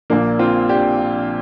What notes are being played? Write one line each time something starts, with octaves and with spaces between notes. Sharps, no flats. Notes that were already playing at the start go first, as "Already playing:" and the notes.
A#1 A#2 F3 A#3 D4
C4 F4
D4 G4